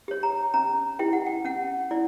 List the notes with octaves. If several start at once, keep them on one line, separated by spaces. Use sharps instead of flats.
G4 C#5
A#5
C#4 A#5
E4 G4 G5
F#5
G5
C#4 F#5
E4 D5